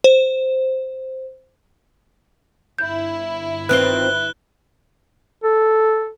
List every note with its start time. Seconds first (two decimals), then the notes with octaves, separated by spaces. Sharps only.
0.04 C5
2.78 G1 E4 G6
3.69 D#3 C4 F4 B4 F#6 G7
5.44 A4